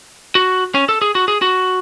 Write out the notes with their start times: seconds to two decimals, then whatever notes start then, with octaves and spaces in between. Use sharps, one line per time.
0.35 F#4
0.75 C#4
0.89 A4
1.02 G#4
1.15 F#4
1.28 G#4
1.42 F#4